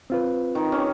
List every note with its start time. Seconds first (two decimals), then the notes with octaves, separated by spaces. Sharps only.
0.10 C4 F4 B4
0.55 D#3 D#4
0.72 C#4 G4